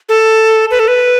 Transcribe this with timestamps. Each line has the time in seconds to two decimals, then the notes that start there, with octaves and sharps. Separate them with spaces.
0.09 A4
0.71 B4
0.79 A4
0.88 B4